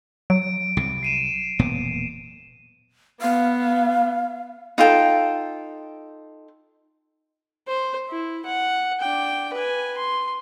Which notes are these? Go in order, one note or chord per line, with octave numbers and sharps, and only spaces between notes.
F#3 D7
C2 C3
C7 D#7 E7
E1 A#2 B3
B3 F5
D#4 F4 A4 G5
C5
E4
F#5
D4 G5
B4 G#5
C6